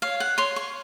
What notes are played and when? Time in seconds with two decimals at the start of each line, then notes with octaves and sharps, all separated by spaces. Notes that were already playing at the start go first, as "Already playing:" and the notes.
0.02 C#5 F5
0.20 F#5
0.38 C#5 C6
0.56 C#6